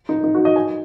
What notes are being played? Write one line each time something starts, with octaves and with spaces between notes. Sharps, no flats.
D#4
D#4
F#4
D#5
G#5